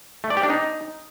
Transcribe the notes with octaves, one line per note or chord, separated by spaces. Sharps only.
A3
D5
G4
D4
D#4